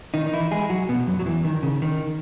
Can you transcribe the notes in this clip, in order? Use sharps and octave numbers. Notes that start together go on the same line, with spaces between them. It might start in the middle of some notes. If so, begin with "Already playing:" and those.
D#3 D#4
D#4
E3 E4
G#3 G#4
F#3 F#4
B2 B3
F#2 F#3
F#3
E2 E3
D#3
C#3
D#3